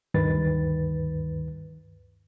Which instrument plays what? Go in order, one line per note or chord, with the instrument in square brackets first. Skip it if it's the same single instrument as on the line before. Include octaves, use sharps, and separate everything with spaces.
[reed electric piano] D2 G2 D#3 B4 A6